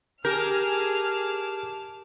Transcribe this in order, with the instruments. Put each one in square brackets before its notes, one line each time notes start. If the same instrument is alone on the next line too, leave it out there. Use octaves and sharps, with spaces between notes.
[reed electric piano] G4 G6 [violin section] G#4 F6 [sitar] A#4 [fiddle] A5 D6